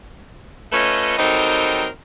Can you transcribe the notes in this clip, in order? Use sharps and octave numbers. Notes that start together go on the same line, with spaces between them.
A3 C#4 F4 B4 C#5 D#5
F#3 G3 C4 D#4 A4 A#4